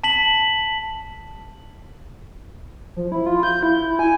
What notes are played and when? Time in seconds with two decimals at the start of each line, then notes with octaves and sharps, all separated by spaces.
0.04 A5 B6 F#7
2.96 F3
3.12 E4
3.26 F4
3.43 G6
3.63 E4
3.99 G#5